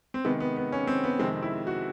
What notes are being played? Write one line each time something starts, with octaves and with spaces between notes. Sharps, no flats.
C4
C3 D#3 G#3 B3
B3
B3
C#4
C4
B3
F2 C3 D#3 G#3 C4
E4
F#4